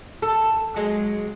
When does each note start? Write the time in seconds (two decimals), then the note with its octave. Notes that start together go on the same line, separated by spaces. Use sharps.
0.22 A4
0.76 F#3 G#3